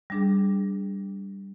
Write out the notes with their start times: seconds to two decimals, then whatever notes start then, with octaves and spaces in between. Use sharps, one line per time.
0.10 G3 D4 G#4